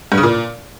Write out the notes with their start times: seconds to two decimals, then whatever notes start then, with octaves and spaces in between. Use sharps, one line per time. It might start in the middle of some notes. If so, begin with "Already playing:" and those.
0.12 G2
0.17 C#3
0.23 A#2